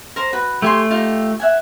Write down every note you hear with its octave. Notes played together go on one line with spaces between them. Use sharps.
A#4 C5
F#4 B4
A3 G4 G#5 C6
D#4 F4 G4
E5 F#5 G#5